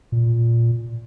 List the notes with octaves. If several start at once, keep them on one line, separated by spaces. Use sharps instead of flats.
A#2